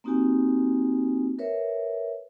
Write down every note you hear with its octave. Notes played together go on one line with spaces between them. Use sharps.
A#3 C4 D#4 F#4 G4 G#5
A#4 B4 C#5 E5